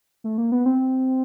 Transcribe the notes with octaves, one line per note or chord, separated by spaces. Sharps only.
A3
A#3
B3
C4